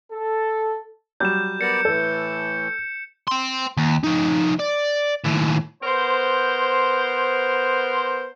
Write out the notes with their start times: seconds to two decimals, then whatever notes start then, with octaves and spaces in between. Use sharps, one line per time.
0.12 A4
1.20 F#3 G3 G6 E7
1.61 B3 A#4 D5 C#7
1.85 A2 E3 A4
3.28 G5 C6
3.77 D#2
4.04 F3 D#4
4.60 D5
5.25 D#2 A2
5.83 B3 A#4 C5